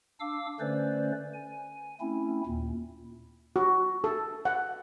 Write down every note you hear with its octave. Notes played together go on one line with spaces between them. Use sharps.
D4 F5 D6 E6
D3 A3 C#4 B4 C5 D5
G#5
A3 C4 C#4 E4
D#2 A#2
F#4
A4
F#5